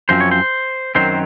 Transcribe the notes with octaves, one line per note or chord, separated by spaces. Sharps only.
F#2 F3 C4 C5
C#5
C5
F#2 D#3 F#3 C4 C5